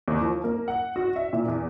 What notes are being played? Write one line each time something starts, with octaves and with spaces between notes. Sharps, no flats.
D#2
F3
A#3
F#5
F#4
E5
A#2
E2